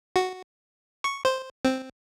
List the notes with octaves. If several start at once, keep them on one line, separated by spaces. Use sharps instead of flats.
F#4
C#6
C5
C4